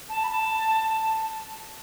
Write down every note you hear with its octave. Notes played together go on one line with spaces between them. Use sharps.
A5
B5
A5